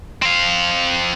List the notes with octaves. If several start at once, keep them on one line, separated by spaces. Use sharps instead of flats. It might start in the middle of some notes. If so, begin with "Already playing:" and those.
C4 F5